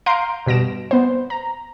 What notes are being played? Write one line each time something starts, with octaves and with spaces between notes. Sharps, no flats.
F5 A#5 C6 G6 C7 D7
G2 B2 A#6 D7 E7
B3 C5
A#5